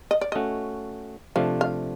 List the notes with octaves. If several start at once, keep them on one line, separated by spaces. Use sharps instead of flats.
D#5
D5
A3 C#4 F#4 D#5
C3 F3 A3 D4 F5
F5